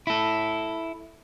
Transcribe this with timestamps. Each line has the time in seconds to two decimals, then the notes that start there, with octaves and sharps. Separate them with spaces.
0.07 E4 A4